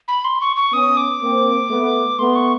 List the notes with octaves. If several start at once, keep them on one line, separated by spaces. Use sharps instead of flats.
B5
C6
C#6
C#6
B3 C#4 D#6
D6
A#3 C4
A3 B3
A3 B3 C6
C#6